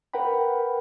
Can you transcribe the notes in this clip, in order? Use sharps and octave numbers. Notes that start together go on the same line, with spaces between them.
A#4 B4 F#5 G5 B5